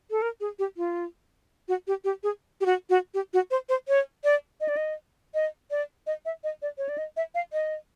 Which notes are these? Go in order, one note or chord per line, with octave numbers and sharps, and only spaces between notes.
A4
A#4
G#4
G4
F4
F#4
G4
G4
G#4
G4
F#4
F#4
G4
F#4
C5
C5
C#5
D5
D#5
D5
D#5
D#5
D5
D#5
E5
D#5
D5
C#5
D5
D#5
E5
F5
D#5